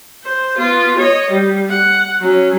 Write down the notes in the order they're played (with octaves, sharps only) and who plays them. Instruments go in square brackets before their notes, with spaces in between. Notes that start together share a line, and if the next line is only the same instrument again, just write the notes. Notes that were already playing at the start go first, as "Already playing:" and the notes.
[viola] C5
B3 F4
C#5 D#5
G3
F#5
F#3 C#4